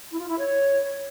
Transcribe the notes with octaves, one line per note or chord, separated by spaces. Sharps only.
E4
F4
E4
C#5